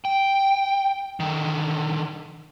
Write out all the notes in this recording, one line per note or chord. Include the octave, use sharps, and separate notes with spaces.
G5
D3 D#3